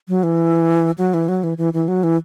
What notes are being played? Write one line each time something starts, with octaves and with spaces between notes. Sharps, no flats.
F#3
E3
F#3
E3
F#3
E3
E3
E3
F#3
E3